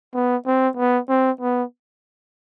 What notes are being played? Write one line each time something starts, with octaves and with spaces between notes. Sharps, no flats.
B3
C4
B3
C4
B3